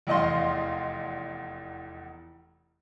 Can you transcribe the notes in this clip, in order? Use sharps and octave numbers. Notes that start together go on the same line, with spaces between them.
F1 E2 D#5 F5 C6